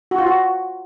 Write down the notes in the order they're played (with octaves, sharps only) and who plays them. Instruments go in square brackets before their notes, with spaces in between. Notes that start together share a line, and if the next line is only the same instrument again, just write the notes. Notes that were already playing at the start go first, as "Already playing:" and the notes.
[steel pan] F#4
F4
F#4